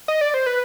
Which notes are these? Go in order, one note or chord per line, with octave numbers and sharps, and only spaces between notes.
D#5
D5
C5
B4